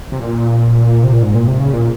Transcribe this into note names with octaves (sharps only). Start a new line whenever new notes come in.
C3
A#2
C3
A#2
G#2
A#2
C3
C#3
A#2